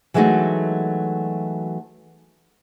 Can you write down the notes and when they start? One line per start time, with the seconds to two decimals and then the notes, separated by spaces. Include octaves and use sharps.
0.14 E3 F#3 G#3 A3 D#4 F#4